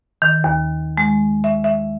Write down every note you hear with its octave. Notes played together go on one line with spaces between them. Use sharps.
D#3
D#2
G#3
E5
E5